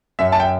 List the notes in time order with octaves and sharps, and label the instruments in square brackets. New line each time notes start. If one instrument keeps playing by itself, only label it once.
[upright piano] F#2 [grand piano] E5
[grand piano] A5
G5